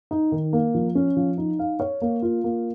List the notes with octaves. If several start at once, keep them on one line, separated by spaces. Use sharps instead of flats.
D#4
D#3
A#3
F3
C#4
F3
D#4
F5
C#5
A#3
F4
A#3